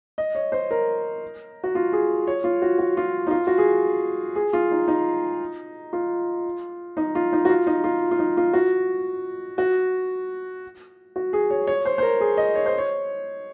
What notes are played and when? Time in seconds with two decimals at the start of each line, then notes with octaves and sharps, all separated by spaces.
0.18 D#5
0.35 C#5
0.52 C5
0.71 A#4
1.64 F#4
1.75 F4
1.93 G#4
2.27 C#5
2.44 F4
2.62 F#4
2.79 F#4
2.97 F4
3.27 D#4
3.31 F4
3.47 F#4
3.58 G#4
4.35 G#4
4.53 F4
4.71 D#4
4.88 D#4
5.93 F4
6.97 D#4
7.15 F4
7.33 D#4
7.45 F#4
7.49 F4
7.67 D#4
7.84 F4
8.11 F4
8.19 D#4
8.37 F4
8.53 F#4
9.58 F#4
11.16 F#4
11.33 G#4
11.50 C#5
11.67 C#5
11.85 C5
11.98 C5
12.02 A#4
12.21 G#4
12.37 D#5
12.55 C#5
12.66 C5
12.78 C#5